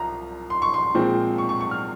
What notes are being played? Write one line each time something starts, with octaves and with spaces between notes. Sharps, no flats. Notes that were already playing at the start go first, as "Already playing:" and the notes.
Already playing: C2 F3 A#5
C6
C#6
C6
A#2 F3 G#3 C4
C#6
C#6
C#6
F6